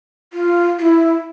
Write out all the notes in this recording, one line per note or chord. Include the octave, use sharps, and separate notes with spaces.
F4
F4
E4